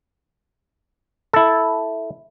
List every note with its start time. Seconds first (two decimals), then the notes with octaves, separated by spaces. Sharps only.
1.33 E4 A4